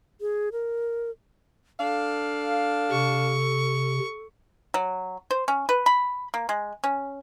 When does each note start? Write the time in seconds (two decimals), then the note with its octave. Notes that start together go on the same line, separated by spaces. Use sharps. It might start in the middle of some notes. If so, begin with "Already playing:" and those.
0.21 G#4
0.52 A#4
1.80 D4 A4 F5
2.91 C3 C#6
4.74 F#3
5.31 C5
5.48 C#4
5.69 B4
5.86 B5
6.34 A#3
6.49 G#3
6.84 C#4